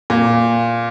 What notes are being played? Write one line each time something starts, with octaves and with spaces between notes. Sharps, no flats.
A#2